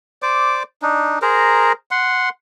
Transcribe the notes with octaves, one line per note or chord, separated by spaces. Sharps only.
C5 D5 D6
D4 D#4
G#4 A#4 C5 A#5
F#5 C6